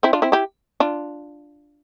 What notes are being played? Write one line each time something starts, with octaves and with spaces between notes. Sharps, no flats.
C4 E4
D4 F4
C4 E4
E4 G4
D4 F4